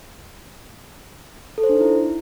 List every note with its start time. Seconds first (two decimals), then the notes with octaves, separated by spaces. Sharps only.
1.58 A4
1.64 C5
1.69 D4
1.75 D#4
1.81 E4